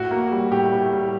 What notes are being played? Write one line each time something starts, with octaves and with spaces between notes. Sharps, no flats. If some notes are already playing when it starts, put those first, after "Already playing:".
Already playing: A2 F#4
A#3
G3
A2 G4
A2
G3